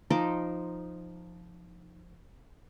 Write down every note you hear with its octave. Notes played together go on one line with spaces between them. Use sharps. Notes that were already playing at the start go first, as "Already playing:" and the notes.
F3 D#4 C6 D6